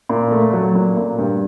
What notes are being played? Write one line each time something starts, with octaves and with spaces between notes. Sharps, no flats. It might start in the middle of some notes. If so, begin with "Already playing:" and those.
A#2
A3
F#3
A#2
A#2
G2